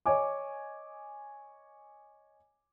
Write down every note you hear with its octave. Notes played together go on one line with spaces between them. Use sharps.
C#5 D#5 G#5 D6